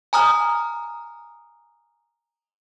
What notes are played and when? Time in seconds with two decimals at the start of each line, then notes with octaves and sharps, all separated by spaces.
0.13 G#5 A#5 D#6 F6